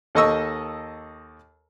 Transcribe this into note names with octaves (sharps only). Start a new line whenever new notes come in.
D#2 A4 D#5 C#6 E6